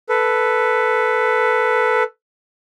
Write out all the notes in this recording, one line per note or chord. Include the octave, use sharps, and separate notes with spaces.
A4 B4